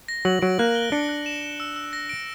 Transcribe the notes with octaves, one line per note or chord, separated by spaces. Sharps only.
A#6
F#3 F#7
F#3 D7
A#3 F#6
G7
D4 C#7
F#6
E7
E7
E6
E6
A#6
D7